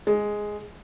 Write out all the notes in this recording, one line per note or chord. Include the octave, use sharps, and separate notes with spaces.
G#3